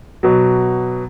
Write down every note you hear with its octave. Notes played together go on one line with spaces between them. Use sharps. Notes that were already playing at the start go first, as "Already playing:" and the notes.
B2 F#3